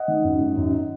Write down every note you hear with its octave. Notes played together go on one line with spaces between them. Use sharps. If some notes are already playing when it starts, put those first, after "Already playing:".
Already playing: D#5 F#5
D#3
F#2
D#3
F#2